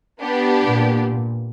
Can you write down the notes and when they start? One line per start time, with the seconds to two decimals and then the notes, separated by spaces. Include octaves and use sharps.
0.21 B3 D4 G4
0.61 A#2